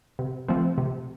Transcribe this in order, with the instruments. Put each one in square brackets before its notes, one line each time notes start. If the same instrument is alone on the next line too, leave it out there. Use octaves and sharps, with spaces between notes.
[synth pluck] C3
F3 A3 C4
C3